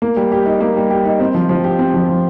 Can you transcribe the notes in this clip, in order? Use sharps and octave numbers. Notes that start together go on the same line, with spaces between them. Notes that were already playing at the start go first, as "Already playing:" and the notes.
A#3
G3
G4
D#4
A#3
G3
G4
D#4
C4
F3
F3
G4
C4
F3
F3